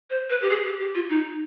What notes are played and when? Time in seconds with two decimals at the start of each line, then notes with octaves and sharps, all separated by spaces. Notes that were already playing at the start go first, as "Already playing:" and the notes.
0.10 C5
0.30 B4
0.42 G4
0.50 G#4
0.65 G4
0.79 G4
0.95 F4
1.10 D#4